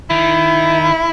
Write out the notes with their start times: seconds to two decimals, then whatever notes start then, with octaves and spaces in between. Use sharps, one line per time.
0.10 D#3 E4